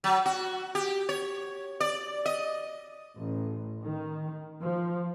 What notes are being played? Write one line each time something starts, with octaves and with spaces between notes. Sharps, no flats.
F#3
F#4
G4
C#5
D5
D#5
A1
D#3
F3